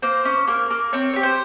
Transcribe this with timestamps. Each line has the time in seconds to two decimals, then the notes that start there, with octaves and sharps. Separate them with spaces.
0.02 A#3 C5
0.25 C#4
0.48 A#3 A#4
0.71 A#3
0.93 C4 C#5
1.13 G4 C#5
1.23 C5